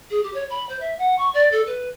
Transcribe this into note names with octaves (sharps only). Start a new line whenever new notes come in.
G#4
G4
C#5
B5
C5
E5
F#5
C#6
D5
A4
B4